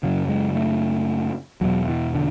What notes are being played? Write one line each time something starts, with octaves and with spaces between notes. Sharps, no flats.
F#2 C#3 F#3
G#3
A3
E2 B2 F#3
E3
D3